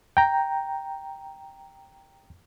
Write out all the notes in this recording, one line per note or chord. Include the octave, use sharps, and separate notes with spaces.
G5 A#5